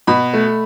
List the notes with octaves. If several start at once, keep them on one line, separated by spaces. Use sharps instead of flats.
B2 B5
A3